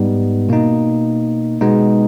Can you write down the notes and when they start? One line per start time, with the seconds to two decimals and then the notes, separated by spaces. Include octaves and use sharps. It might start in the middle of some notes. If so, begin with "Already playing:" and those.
Already playing: G#2 G3 B3 D#4
0.49 B2 A#3 D#4
1.61 B2 G#3 B3 D#4